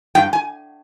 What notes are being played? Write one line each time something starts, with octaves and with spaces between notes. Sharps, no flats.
G2 G5
G#5